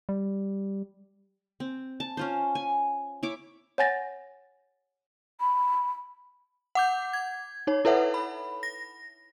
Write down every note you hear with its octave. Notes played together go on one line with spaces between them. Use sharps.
G3
C4
A5
C#4 F4 C5
G#5
E4 C#5 D6
C#5 F#5 G#5 A6 A#6
B5
F#5 D6 G6
G#6
D#4 C#5
E4 A4 B4 C#5 E5 F#5
B5
A#6